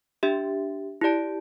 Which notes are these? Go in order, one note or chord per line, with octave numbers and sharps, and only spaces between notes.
D4 G4 E5
E4 G4 D5 A5